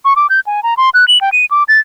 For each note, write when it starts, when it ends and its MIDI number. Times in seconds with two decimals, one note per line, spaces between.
0.05 0.14 85
0.16 0.27 86
0.30 0.40 91
0.47 0.63 80
0.63 0.74 82
0.77 0.90 84
0.94 1.05 90
1.08 1.21 102
1.21 1.30 79
1.32 1.45 99
1.51 1.63 86
1.68 1.80 93